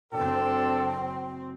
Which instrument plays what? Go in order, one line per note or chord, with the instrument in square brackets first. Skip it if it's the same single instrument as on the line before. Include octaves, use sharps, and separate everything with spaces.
[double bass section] F#1 C4 [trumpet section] D4 A4 [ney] G5